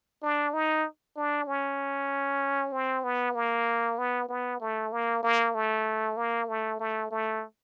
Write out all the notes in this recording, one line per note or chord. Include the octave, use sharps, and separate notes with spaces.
D4
D#4
D4
C#4
C4
B3
A#3
B3
B3
A3
A#3
A#3
A3
A#3
A3
A3
A3